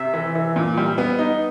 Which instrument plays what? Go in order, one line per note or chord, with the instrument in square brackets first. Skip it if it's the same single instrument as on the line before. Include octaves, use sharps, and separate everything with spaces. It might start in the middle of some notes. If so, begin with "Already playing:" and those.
Already playing: [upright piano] C3 [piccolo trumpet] E5
[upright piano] E3
E3
A#2
G3
B3
D#4